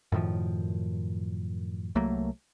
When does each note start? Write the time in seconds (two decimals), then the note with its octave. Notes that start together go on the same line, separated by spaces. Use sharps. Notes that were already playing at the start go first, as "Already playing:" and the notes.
0.12 F#2 A2 D#3 F3
1.95 C2 F#3 A3 A#3